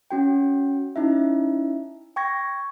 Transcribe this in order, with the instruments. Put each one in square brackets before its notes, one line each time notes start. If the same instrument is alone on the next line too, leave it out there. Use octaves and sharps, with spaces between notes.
[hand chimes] C#4 F#4 G5
C#4 D#4 E4 E5
G5 C#6 G#6 A#6